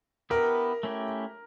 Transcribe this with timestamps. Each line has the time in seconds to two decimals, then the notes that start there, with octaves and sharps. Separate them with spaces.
0.30 B3 E4 G4 A#4 B4
0.83 A3 C#4 E4 G4